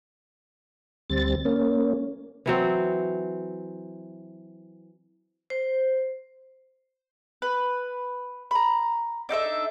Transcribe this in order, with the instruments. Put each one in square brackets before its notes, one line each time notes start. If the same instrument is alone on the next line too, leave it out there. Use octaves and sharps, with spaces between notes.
[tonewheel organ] D2 G3 C4 A6
A#3 C#4
[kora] E3 F#3 C4
[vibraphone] C5
[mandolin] B4
A#5 B5
D4 D#4 A4 E5